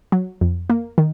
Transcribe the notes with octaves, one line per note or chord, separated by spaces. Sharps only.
F#3
F2
A#3
D#3